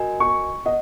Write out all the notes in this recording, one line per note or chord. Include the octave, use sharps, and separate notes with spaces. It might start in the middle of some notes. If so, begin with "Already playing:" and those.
Already playing: F#4 A#4 D#5 G#5
C#6
D#5 F#5